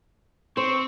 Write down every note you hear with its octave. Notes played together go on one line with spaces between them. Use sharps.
C4 C5 C#6